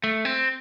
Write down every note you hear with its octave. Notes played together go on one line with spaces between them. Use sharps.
A3
C4